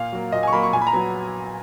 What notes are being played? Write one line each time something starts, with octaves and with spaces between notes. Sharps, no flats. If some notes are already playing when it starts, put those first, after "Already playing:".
Already playing: A#2 F5
F#3 A#3
A#2 D#5
G#5
C#6
F#3 A#3 B5
C#6
A#2 G#5
B5
A#5
F#3 B3